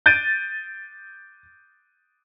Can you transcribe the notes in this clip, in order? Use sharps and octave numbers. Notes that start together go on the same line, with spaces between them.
G6 A6 D7 D#7